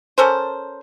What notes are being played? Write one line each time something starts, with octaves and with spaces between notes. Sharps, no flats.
C#4 A4 A#4 C5